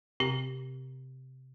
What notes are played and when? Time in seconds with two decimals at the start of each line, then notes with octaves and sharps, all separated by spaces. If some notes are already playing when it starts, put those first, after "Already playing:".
0.20 C3 C4 G4 A#6